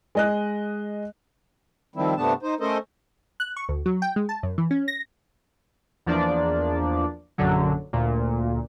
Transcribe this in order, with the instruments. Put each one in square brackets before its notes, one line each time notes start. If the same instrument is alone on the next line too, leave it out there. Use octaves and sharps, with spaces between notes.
[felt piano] G#3 D#5 F#6
[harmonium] D#3 F3 G3 C4 E4
G2 C3 A3 B3 D4 A5
D#4 C5
A3 C#4 A4 A#4 C5 D#5
[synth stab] F#6
C#6
D2
F#3
G5
G#3
A5
F#2
E3
C#4
A#6
[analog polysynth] E2 F3 A#3 D4 D5
A#1 F#2 D3 F#3
D2 A#2